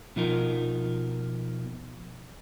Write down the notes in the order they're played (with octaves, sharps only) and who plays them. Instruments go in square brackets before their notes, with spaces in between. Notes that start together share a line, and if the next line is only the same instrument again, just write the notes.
[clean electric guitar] B2 F3 D#4 A#4